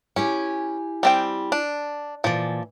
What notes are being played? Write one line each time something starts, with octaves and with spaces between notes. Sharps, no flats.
C#4 E4 G4 G#5
G3 C4 G5
D4
A#2 E3 F3 D5